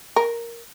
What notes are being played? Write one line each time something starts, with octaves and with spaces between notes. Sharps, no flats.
A#4